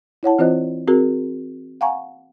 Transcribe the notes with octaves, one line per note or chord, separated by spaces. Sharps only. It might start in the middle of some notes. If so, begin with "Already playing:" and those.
E4 C#5 F#5 A5
E3 C4 F4 C5 D#5 F#6
C4 F#4 G#4 A#4
F5 F#5 G#5 A#5 C#6